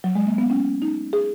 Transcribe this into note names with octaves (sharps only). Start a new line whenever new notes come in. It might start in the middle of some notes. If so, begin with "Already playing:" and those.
F#3
G#3
A#3
B3
C#4
D#4
G#4